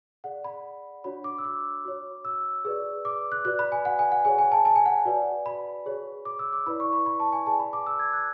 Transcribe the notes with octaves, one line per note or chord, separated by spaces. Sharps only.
G#4 D5 F#5
B5
D4 F#4 C#5 B5
D6
E6
D6
F#4 C#5
E6
G#4 B4 D5
D6
F#6
F#4 B4 D5 F#6
B5
G#5
F#5
G#5
F#5
G#4 C#5 G#5
G#5
A5
A5
G#5
F#5
F#4 B4 D5
B5
G#4 C#5
D6
E6
D6
E4 B4 D5 B5
C#6
B5
B5
A5
G#5
G#4 B4 D5 A5
B5
D6
E6
G#6
F#6